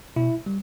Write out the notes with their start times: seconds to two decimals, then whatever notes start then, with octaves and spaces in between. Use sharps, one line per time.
0.16 B2 E4
0.46 G3